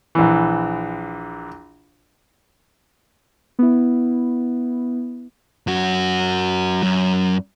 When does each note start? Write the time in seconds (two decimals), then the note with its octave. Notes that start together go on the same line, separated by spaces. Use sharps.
0.15 A#1 E3
3.59 B3 E4
5.67 F#2 F#4
6.83 F#2